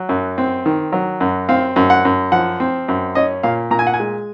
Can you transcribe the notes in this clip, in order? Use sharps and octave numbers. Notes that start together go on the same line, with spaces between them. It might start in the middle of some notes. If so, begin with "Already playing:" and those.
Already playing: F#3
F#2
C4
D#3
F#3
F#2
C4 F5
F#2
F#5
F#2
F3 F#5
C4
F#2
C#4 D#5
A#2 F5
A#2 A#5
G#5
F#5
G#5
G#3